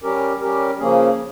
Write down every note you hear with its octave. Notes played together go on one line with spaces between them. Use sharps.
G3 C#4 G4 A#4
G3 C#4 G4 A#4
C#3 F3 A#3 C#4 G#4